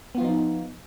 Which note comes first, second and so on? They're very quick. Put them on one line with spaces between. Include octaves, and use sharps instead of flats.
B3 F4 F3 D#4